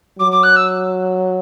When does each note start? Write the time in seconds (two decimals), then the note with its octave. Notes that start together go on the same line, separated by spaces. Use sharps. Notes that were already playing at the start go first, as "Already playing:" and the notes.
0.19 F#3 D6
0.31 D6
0.43 F#6
0.56 E6